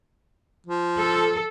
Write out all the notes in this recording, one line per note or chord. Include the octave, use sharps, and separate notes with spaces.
F3
A4